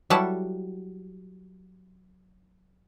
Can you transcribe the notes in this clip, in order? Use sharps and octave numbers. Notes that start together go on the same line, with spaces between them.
F#3 G3 E4 A4 F#5 A5